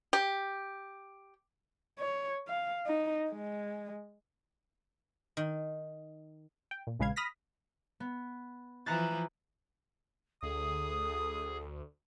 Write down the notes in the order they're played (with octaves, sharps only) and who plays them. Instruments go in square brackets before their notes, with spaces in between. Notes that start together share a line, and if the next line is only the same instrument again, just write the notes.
[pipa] G4
[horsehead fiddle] C#5
F5
D#4
G#3
[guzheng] D#3
[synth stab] G5
A#2
A#1 C#3 G#3 B4 F5 G#6
B5 D#6 F6 A#6 B6
[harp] B3
[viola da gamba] E3 F3 [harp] A#5 F#6 A6
[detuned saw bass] D2 [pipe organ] G#4 [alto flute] A4 [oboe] D#6